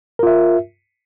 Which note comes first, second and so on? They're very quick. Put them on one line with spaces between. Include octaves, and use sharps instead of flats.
A#4 F4 E5